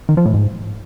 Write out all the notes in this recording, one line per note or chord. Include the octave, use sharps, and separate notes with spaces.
D#3
F3
A2
G#2